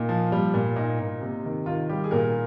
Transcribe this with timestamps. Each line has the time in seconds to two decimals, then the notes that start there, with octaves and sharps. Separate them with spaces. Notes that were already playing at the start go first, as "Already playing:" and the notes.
Already playing: A#2 D#4
0.09 F3
0.32 G3
0.54 A#2
0.76 A#2 D#4
1.00 A#2
1.21 C3
1.45 D#3
1.66 D#3 F4
1.89 G3 G4
2.04 G#4
2.11 A#2 A#4